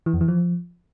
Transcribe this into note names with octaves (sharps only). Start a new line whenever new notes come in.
E3
F2
E3
F3